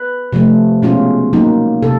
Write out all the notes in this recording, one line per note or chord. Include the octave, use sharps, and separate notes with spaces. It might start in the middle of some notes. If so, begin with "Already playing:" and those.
Already playing: B4
C3 F3 A3
B2 G#3 C#4 F4
F#3 A#3 D#4
C3 A4